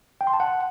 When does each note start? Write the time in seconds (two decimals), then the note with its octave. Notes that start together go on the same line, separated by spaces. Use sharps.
0.21 G5
0.27 C6
0.34 A5
0.40 F#5